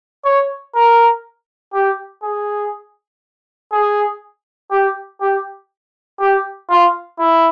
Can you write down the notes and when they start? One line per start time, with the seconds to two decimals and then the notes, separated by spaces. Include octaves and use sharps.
0.25 C#5
0.75 A#4
1.73 G4
2.23 G#4
3.72 G#4
4.71 G4
5.21 G4
6.20 G4
6.70 F4
7.19 E4